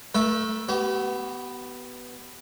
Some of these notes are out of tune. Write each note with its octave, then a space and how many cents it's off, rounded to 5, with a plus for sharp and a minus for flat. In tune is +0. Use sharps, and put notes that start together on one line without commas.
A3 +0 A#4 +45 E5 -5
B3 +0 G4 -40